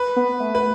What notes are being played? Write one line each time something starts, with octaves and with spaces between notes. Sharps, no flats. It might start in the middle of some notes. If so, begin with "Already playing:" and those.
Already playing: B4
B3
A3
B4